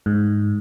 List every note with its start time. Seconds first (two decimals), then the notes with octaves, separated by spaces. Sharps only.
0.06 G#2